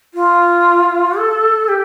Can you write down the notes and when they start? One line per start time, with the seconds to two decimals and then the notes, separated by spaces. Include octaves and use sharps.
0.14 F4
1.17 A4
1.68 G4